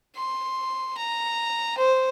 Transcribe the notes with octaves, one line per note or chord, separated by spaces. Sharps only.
C6
A#5
C5